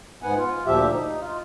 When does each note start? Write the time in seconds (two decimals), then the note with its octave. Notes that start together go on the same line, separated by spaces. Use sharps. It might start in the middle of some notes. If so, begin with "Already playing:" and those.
0.22 G#2 B3 F#5 G#5
0.38 F4
0.66 D2 A#2 F3 G4 E5
0.91 D#4
1.20 F4